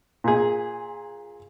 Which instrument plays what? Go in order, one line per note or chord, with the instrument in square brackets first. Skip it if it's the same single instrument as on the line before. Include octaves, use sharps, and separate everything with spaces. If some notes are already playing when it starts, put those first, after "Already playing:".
[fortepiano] A#2 G#4